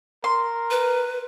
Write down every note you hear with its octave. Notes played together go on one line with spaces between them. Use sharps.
A#4 C6
B4